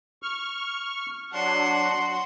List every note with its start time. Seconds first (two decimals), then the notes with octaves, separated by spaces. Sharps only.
0.23 C#6 F6
1.33 F#3 D4 F#4 C6